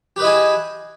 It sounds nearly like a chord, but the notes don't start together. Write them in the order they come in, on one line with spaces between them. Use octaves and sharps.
G4 B4 D#5 E4 G#4